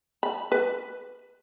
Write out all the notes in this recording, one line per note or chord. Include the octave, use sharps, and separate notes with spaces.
B5
B4